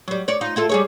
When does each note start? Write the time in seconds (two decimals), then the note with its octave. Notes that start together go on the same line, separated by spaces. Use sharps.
0.08 F#3 G3
0.28 C#5 D5
0.41 D#4 F4
0.56 E4 F4 A4
0.69 G3 G#4 C#5